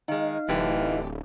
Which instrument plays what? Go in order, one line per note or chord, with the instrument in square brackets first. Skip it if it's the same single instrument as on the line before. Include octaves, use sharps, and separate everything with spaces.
[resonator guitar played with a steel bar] D#3 G#3 [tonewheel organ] D#4 F5
[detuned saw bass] D1 [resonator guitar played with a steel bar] D3 G4 [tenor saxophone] E3